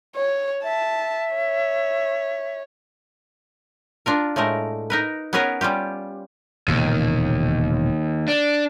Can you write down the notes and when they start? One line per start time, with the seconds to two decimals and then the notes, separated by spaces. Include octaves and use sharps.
0.16 C#5
0.64 E5 A5
1.35 C#5
4.06 D4 F4 A#4
4.36 A2 G#3 A3 A#4
4.90 D#4 A#4 B4
5.33 B3 C#4 G#4 A#4 B4 C#5
5.61 G3 C#4 F4 G4
6.68 E1 D#2 A#2 C#3
8.28 D4